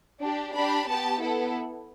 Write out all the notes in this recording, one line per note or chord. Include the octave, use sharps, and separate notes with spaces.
D4 G4
D4 G4 B5
B3 G4 A5
B3 E4 A4